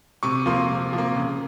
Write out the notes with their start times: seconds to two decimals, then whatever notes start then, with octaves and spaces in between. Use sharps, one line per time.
0.23 C3 C#6
0.46 F3 A#3 C6
0.69 C3
0.93 F3
0.98 A#3
1.16 C#3